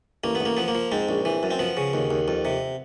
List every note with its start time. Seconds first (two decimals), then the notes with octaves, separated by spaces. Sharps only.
0.24 A1 A#3
0.35 B3
0.40 A1
0.46 A#3
0.57 F3 B3
0.68 A#3
0.75 F3
0.92 G#2 C4
1.09 A#1
1.25 E3
1.43 F#2
1.51 C4
1.59 F3 B3
1.77 C#3
1.94 D#2
2.10 D#2
2.28 F2
2.45 C3